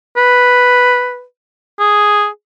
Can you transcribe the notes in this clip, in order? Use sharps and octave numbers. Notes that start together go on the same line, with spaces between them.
B4
G#4